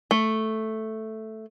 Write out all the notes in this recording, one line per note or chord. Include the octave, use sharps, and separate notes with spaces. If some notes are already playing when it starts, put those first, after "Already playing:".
A3